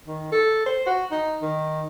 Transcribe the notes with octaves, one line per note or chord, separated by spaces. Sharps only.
D#3
A4
C5
F#4
D#4
D#3